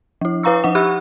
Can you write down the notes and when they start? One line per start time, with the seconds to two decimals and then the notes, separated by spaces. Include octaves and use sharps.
0.21 F3 E4
0.43 E4 B4 F5 A#5 C#6 E6
0.64 F3 D#4 F#5
0.75 G4 F#5 B5 C#6 E6 F#6